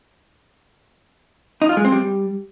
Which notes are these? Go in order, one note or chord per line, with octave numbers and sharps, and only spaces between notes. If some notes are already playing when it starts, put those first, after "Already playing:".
D#4
F4
G#3
C4
G3